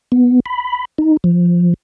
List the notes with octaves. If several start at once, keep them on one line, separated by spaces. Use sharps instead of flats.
B3
B5
D#4
F3